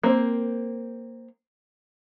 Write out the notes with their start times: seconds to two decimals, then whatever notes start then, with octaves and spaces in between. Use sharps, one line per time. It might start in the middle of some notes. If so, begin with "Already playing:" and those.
0.03 A#3 C4